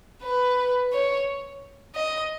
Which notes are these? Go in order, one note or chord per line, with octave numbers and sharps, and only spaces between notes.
B4
C#5
D#5